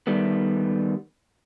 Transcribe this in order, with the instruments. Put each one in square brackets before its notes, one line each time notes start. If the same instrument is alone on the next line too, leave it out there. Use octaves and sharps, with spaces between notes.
[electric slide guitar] D#3 G3 A3 B3